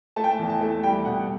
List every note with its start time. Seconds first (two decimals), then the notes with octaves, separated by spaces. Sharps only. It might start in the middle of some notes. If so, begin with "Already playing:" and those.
0.16 A3 A5
0.24 G5
0.31 A5
0.39 E2
0.49 A5
0.61 A3
0.83 G3 G5
1.05 B2 F#5